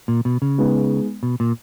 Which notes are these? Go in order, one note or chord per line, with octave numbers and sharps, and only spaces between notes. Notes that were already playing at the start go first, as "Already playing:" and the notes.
A#2
B2
C#3
G#3 B3 D#4
B2
A#2